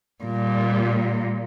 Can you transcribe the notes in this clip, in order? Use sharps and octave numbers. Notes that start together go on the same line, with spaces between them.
A#2 G3